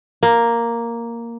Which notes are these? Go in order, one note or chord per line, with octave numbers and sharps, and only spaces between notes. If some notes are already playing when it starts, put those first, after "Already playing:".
A#3